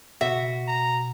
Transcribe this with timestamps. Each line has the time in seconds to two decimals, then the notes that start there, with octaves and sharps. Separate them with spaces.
0.21 B2 F#4 E5
0.68 A#5